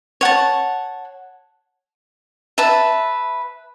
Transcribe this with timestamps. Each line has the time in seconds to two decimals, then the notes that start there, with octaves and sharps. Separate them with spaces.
0.21 C#5 F#5 A5
2.58 B4 E5 A5